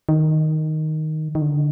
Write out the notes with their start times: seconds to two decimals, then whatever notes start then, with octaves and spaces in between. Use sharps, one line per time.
0.09 D#3
1.35 D#3
1.42 D3